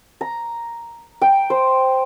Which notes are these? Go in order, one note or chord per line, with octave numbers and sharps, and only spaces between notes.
A#5
G5
C5